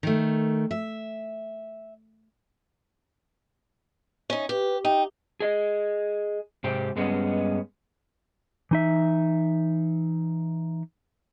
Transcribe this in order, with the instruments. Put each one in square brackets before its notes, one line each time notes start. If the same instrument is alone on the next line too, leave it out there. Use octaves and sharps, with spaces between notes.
[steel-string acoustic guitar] D#3 A3
E5
C#4 D#4
[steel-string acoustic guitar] G4 [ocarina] B4
[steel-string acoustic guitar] D#4 [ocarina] G5
[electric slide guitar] G#4 D#5
G#2 C3 C4 G4
G2 G#3 B3 C#4 D#5
E3 D#4 E5